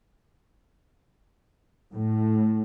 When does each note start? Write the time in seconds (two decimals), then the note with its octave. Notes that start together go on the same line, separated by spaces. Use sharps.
1.93 A2